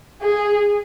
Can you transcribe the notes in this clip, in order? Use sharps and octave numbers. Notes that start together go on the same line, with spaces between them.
G#4